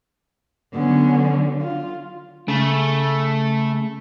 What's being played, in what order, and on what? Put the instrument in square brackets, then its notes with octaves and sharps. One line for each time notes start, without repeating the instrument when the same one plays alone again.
[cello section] D3 F#3 [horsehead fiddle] B3 C#4
[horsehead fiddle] F4
[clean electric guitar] C#3 [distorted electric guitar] A3